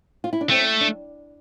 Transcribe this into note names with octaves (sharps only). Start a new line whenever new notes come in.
F4
E4
D4
A3 C4
D4